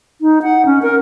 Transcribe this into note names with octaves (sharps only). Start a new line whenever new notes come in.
D#4
F#5
C#4
A#4